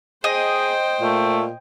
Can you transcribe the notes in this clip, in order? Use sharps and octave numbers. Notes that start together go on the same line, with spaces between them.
G#4 C5 D#5 G5
A#2 A3